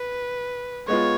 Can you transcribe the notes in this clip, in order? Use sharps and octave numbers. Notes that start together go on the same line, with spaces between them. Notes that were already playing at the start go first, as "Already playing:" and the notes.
Already playing: B4
G#3 B3 F4 C#5